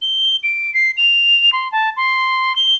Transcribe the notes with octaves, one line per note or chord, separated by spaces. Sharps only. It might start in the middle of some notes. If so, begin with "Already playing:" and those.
G7
D7
C7
F7
C6
A5
C6
G7